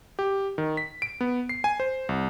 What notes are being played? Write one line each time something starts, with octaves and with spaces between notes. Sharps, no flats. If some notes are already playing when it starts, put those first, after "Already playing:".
G4
D#3
B6
D7
B3
C7
G#5
C5
C2